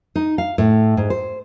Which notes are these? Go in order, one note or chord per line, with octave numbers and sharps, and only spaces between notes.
D#4
F5
A2
G#2
C5